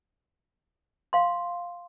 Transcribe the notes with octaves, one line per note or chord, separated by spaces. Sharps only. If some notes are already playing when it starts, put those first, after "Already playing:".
F5 C6